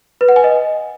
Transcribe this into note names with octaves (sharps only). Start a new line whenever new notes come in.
B4
F#5
G#5
D#5